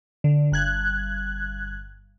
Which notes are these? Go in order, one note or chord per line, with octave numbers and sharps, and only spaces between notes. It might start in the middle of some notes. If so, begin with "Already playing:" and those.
D3
G1 F#6 G#6